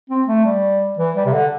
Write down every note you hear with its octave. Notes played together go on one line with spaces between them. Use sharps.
C4
A3
G3
E3
G3
C3
D3